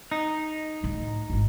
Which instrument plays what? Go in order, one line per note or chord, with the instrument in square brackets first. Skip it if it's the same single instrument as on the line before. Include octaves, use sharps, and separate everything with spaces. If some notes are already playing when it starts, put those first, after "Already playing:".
[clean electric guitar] D#4
[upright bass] D2 A2
D#1 G#1